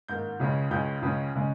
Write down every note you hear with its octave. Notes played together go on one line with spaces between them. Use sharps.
G#2 D#3 A#3 G6
C#2 C#3 G#3 C#4
C#2 C#3 G#3 C#4 G6
C#2 C#3 G#3 C#4
C#3 G#3 C#4